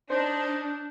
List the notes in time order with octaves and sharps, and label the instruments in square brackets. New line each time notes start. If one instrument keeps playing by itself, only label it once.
[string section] D4 [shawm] D#4 [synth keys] C5